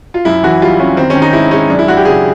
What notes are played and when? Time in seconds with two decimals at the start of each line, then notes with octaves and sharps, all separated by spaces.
0.14 F4
0.25 F#2 E4
0.43 E3 F#4
0.62 G3 F4
0.80 G3 C#4
0.97 D#3 C4
1.10 C#4
1.16 D#3
1.22 D#4
1.33 G#2 E4
1.51 G#3 C#4
1.69 F#2 D4
1.79 E4
1.88 F#2 F#4
1.97 G4
2.05 C#3 G#4